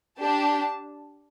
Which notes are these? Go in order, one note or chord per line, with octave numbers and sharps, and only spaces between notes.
D4 G4 A5